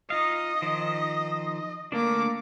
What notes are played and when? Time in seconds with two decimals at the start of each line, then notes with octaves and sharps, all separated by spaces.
0.10 D#4 F4 D#5 F5
0.62 D#3 F3
1.92 D3 A3 A#3 D4 D6